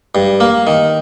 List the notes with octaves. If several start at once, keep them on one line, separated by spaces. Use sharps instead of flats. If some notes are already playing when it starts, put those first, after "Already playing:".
G2
A#3
D#3